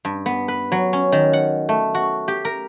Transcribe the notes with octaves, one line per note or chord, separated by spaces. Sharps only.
G2
B3
B4
F#3
C#4
D#3
F#5
A3
F#4
G4
A#4